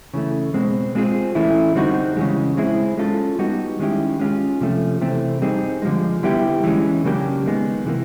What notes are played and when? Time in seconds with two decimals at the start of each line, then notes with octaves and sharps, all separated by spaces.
0.14 C#3 E3 A3
0.54 B2 G#3 C4
0.95 G#3 C4 F4 G#4
1.35 E3 A3 C#4 E4
1.76 D3 G3 C4 D#4 F#4
2.17 C#3 E3 G#3
2.57 G#3 C4 E4 G#4
2.97 G#3 C#4 F4 A4
3.39 G3 B3 D#4 F#4
3.79 D#3 G#3 C#4 E4 G4
4.20 G#3 C#4 F4 G#4
4.61 C3 F3 A3 C#4
5.01 C3 E3 A3 C4
5.42 G3 C4 D#4 G#4
5.82 D3 F3 G#3
6.23 D3 G3 B3 E4 G4
6.64 E3 G#3 C#4
7.04 C#3 F#3 A#3 D4 G4
7.46 D#3 G#3 B3
7.86 C3 E3 G3 A#3